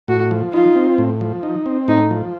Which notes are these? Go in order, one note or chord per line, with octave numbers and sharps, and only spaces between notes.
A2 F#4
F3
D#4 F4
C4
A2
F3
D#4
C4
A2 D#4
F3